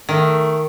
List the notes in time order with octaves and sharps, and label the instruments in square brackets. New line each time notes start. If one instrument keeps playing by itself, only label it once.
[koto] D#3 [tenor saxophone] A3